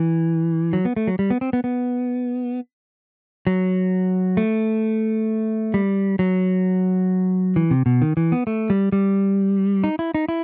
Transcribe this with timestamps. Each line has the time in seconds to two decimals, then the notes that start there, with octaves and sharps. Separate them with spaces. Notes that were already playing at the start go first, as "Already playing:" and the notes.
Already playing: E3
0.73 F#3
0.85 B3
0.96 A3
1.07 F#3
1.19 G3
1.30 B3
1.41 C4
1.53 B3
1.64 B3
3.47 F#3
4.37 A3
5.74 G3
6.19 F#3
7.56 E3
7.71 C3
7.86 B2
8.02 D#3
8.17 E3
8.32 B3
8.47 A3
8.70 G3
8.92 G3
9.84 D#4
9.99 E4
10.15 D#4
10.29 E4